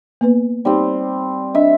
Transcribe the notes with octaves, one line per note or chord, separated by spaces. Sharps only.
A#3 B3 B4
G3 C4 D#4 G4
D4 D#5 E5